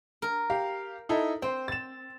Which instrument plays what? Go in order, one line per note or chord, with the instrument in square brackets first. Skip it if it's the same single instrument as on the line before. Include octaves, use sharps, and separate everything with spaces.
[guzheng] A#4
[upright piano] G4 F5
D#4 E4 A4
[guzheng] C4 [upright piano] C5
[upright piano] A6 E7